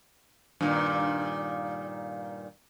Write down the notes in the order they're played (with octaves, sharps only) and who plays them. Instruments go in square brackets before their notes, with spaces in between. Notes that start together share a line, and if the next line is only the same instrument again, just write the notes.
[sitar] G2 A#2 D#3